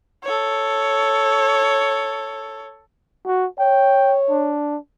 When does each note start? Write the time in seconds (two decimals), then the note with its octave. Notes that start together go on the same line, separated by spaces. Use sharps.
0.24 A4 C#5
3.26 F#4
3.59 C#5 G5
4.29 D4